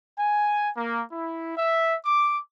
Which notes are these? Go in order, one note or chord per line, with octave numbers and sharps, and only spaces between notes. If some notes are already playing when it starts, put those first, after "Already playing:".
G#5
A#3
E4
E5
D6